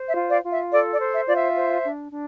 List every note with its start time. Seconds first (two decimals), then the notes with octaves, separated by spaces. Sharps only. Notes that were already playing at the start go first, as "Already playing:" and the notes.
Already playing: C5
0.09 E5
0.16 F4
0.30 D5 F5
0.44 F4
0.51 E5
0.72 A4 D5
0.93 D5
1.00 C5
1.14 E5
1.27 F4 D5
1.35 E5
1.56 C5
1.84 D4
2.12 D4